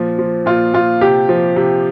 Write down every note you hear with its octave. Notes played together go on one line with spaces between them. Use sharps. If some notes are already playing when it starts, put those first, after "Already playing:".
Already playing: A#2 F3
F3
A#2 F4
A#2 F4
C3 G4
F3
C3